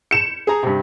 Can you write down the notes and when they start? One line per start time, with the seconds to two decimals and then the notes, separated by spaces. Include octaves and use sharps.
0.11 C#7 E7
0.47 G#4 A#5
0.63 G2 C3